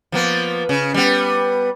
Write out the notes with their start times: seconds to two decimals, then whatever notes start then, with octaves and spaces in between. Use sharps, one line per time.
0.12 F3 A#3 B3
0.69 C#3
0.94 G3 B3